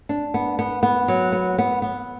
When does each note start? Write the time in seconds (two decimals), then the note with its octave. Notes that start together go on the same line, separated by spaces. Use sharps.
0.09 D4
0.34 B3
0.59 B3
0.83 B3
1.08 F#3
1.32 B3
1.58 B3
1.82 B3